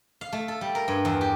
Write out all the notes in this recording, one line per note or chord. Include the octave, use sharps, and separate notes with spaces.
F5
A3
A4
G3
A#4
G2
E2
G4